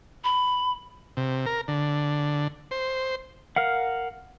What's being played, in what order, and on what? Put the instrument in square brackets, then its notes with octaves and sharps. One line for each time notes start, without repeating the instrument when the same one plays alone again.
[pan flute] B5
[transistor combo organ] C3
A#4
D3
C5
[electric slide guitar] A#4 F5 F#5